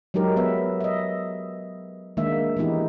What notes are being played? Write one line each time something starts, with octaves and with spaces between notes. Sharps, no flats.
F#3 G#3 D#4 G4 A#4
B3 B4 E5
D#5 E5
D#3 G#3 A#3 D4 E5
E3 G#3 B3 D#4 E4 G4